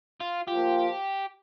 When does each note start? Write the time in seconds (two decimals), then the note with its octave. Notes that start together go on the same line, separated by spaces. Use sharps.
0.20 F4
0.48 F3 A#3 F4 G4